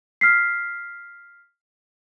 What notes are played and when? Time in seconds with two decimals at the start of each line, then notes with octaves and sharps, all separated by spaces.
0.21 F6 B6 C7